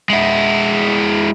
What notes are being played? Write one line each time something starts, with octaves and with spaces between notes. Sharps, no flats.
G#3 E4